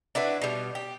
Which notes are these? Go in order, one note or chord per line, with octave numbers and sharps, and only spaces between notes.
D4 E4 F#4 B4
B2 G3
G4